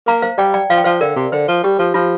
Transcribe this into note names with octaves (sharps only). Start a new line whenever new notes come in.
A#3 F5 A#5
C5 F5
G3 D5 G5
D5 G5
F3 F5
G5
F3 C5 F5
D3 A#4 D5
C3
D3 C5
F3
G3 G4
F3
F3 F4